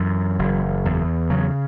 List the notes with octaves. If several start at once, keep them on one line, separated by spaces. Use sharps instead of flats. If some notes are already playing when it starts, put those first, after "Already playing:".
Already playing: F#2 E3
F#1
E2
C#3 F#3